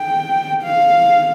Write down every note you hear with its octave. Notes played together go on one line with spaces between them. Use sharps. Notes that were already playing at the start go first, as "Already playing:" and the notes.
Already playing: G5
F5